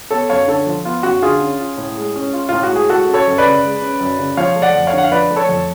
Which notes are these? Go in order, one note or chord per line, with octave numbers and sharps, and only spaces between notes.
B3 A4 C#5
F#2 C#5 F5
D3 A4 C#5
F3
B3 F4
F#2 F#4
D3 F4 G#4
C#4
F4
A2
G#3
C#4
F4
A2 F4
F#4
G#3
G#4
G#3 F#4 A4
C#4
A4 C#5
F#2
B4 D5
C#3
G#3
C#4
F#2
C#3
F3 C#5 F5
A3
D5 F#5
F2
C#5 F5
D3 F#5
F5
F3 B4 D5
A3
A4 C#5
F2